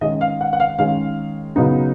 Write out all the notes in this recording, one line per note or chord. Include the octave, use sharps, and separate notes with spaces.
D#3 G#3 C#4 D#5
F5
F#5
F#5
F5
D#3 G#3 C#4 F5
C#3 F#3 B3 D#4